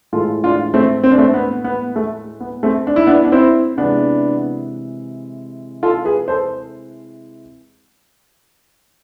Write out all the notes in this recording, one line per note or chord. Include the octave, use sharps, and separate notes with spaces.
A2 E3 G#3 F4 A4
D4 F4
A3 C4
C4
D4
A3 C4
B3
B3
A3
B3
A3 C4
D4
E4
B3 D4
D4
C4 E4
C3 E3 G#3 B3 D4
F4 A4
G#4 B4
A4 C5